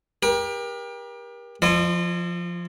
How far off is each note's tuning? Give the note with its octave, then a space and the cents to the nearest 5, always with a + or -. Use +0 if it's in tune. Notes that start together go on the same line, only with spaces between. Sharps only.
G4 +25 A#4 +40
F3 +0 E4 +45 D#5 -40